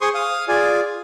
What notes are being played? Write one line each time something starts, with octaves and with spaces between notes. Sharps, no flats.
G#4 C5 C6 C#6 D#6
F5 D#6
F4 G#4 D5 G#5